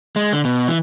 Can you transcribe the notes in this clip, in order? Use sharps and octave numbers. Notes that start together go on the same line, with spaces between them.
G#3
D3
B2
E3